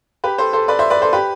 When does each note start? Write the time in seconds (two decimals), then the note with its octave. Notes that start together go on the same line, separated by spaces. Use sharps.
0.24 G4 B4
0.38 A4 C5
0.53 A4 C5
0.68 B4 D5
0.79 C5 E5
0.90 B4 D5
1.02 A4 C5
1.13 G4 B4